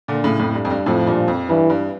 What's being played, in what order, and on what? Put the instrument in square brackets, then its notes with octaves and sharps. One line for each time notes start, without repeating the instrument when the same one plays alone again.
[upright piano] A#2 D3
A2 C#3
F2 A2
G2
F2
G2
[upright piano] F2 A2 [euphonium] F3
[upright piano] G2 A#2
F2
[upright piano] G2 [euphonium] E3
[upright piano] G2